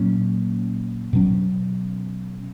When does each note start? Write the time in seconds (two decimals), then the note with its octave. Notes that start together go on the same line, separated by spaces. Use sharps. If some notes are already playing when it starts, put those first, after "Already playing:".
Already playing: A#2 F#3 A#3 C#4
1.13 B2 F#3 C#4